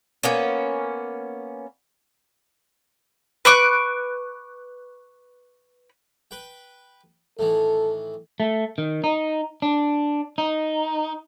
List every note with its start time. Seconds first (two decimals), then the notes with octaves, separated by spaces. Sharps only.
0.23 A#3 B3 C#4
3.45 B4 C#6 D6 F#6
6.31 B4 G5
7.39 A2 D#3 E3 A4
8.40 A3
8.78 D#3
9.04 D#4
9.62 D4
10.38 D#4